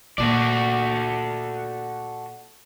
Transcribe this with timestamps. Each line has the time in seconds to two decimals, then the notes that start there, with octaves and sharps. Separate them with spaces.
0.18 A#2 A#3 F#4 A4 D5